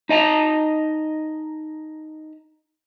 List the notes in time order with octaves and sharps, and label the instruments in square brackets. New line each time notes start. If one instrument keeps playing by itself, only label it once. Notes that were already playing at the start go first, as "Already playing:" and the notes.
[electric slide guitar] D#4 D#5 A5 A#5